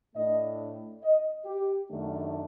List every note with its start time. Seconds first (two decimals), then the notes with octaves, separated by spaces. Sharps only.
0.16 A2 A3 D4 D#5
1.03 D#5
1.46 G4
1.89 F#2 D#3 A3 D4